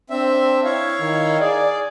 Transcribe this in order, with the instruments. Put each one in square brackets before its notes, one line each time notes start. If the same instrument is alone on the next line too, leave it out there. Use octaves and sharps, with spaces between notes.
[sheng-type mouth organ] C4 E5 [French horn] D4
[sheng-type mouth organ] E4 C#5 F5
[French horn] D#3
[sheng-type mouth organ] G#4 [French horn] D5